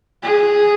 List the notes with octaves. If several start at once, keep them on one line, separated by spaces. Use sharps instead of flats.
G#4